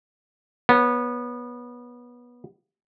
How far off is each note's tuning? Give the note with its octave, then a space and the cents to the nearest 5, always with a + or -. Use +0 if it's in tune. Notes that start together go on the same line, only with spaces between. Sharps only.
B3 -20 C#5 +0